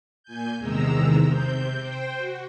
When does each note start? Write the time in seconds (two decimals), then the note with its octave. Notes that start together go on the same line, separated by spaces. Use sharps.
0.23 A#2 G#5 G6
0.58 E2 C3 D#3 G#3 A#5 E6
1.25 C3 C4 G6
1.76 C5 G5
2.15 F#4